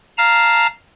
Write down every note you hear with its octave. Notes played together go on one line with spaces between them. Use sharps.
F5 A5 A#5 F6